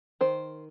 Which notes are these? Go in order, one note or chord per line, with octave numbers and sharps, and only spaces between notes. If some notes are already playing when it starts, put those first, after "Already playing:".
D#3 C5